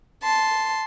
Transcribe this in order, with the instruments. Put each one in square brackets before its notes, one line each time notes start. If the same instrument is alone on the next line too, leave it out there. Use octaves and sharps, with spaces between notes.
[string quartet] A5 C6